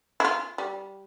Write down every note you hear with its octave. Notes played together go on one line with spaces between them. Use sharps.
E4 F4
G3